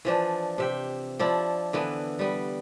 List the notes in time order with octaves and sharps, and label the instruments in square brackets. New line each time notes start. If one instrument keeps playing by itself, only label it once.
[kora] E3 F3 D4
C3 E5 G5
F3 D4 E4
D3 E3 B3
G3 B3